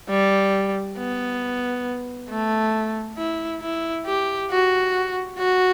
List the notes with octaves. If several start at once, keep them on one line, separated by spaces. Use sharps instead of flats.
G3
B3
A3
E4
E4
G4
F#4
F#4